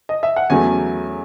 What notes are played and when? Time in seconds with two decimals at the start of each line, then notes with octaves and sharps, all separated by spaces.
0.09 D#5
0.23 E5
0.36 F#5
0.50 E2 C#3 F#3 A3 G#5